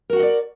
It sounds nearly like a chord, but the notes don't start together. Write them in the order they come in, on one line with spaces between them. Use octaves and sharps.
A#4 F#4 F#5 D#5 D5